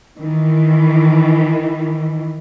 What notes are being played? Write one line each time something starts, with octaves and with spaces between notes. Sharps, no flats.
D#3 E3